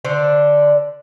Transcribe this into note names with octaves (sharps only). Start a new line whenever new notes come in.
D3 D4 C5